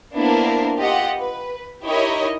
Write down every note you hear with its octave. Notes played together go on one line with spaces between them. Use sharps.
A#3 B3 D4 E4 A#4 C5
F4 G4 D#5 F#5
B4
D#4 E4 G4 A#4 C#5 D#5